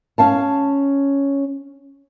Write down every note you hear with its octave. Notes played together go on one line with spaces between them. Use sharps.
C#4 F5 A5